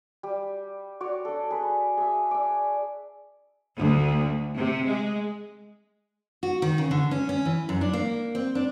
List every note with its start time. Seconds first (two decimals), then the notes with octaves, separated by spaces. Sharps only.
0.23 G3
1.01 F#4 C#5 D5
1.25 D4 A4
1.51 G#4 B4
1.97 G#4 E5
2.31 D5 E6
3.78 D2
4.56 C3
4.86 G#3
6.43 F#4
6.62 D#3
6.78 C#3
6.91 D3
7.11 C#4
7.29 C#4
7.45 E3
7.69 F#2
7.81 D4
7.93 A#3
8.35 C4
8.55 D4